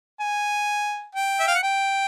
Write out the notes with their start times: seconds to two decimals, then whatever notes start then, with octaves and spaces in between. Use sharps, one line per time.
0.20 G#5
1.15 G5
1.40 E5
1.48 F5
1.55 F#5
1.63 G5